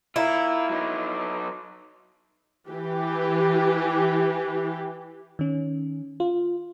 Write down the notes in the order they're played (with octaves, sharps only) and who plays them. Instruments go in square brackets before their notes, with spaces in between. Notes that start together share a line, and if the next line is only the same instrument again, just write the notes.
[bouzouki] E4 [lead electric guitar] F4 A#4
[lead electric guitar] F#3 D#4
[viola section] E3 G4
[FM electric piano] D#3 C#4
F4